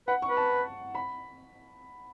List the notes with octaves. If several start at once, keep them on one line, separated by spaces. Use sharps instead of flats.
B4 F#5
C#6
B4
A5
B5